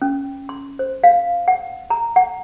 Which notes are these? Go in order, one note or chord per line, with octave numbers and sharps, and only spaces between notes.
C#4
C6
C5
F5
F#5
A#5
F#5